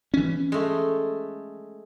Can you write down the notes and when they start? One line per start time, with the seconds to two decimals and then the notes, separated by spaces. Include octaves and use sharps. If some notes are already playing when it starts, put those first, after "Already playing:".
0.14 E3 C#4
0.52 G#3 A3